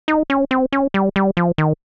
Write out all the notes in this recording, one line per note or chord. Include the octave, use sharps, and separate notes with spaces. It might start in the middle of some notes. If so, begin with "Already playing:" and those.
D#4
C#4
C4
C#4
G3
G3
F3
D#3